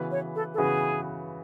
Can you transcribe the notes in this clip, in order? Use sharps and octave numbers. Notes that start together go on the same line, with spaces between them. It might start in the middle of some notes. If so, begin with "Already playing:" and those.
Already playing: C#3 E3 B3 F#4 B4
C#5
A4
A4
C#3 E3 B3 F#4 G#4 B4